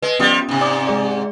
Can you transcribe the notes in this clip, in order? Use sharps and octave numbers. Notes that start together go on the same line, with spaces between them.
G#3 B4 D#5
F3 G3 B3 C#4 D#6
G#2 C3
D5 D6 D#6
G#3 G#4 D5